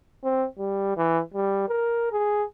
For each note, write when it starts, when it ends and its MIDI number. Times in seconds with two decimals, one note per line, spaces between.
0.24 0.46 60
0.59 0.94 55
0.97 1.21 52
1.34 1.65 55
1.68 2.10 70
2.12 2.44 68